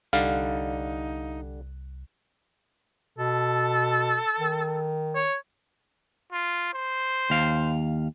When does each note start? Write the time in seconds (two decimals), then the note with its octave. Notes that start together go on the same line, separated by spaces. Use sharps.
0.13 C2 D3 G3 D#4 F5 F#6
3.18 B2 A4
4.39 D#3
5.15 C#5
6.33 F4
6.73 C5
7.30 D#2 F5